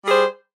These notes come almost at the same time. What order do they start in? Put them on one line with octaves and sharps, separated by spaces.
G3 G#4 C5